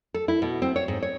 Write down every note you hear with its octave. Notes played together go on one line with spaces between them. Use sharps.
A4
E4
B2
C4
C#5
G#2
C#5